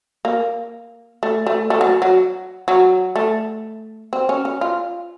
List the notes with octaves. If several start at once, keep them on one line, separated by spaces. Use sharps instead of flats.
A#3
A3
A3
A3
F#3
F#3
F#3
A3
C4
C#4
C#4
F4